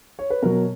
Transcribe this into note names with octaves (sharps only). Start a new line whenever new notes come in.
C#5
B4
B2 F#3 A#4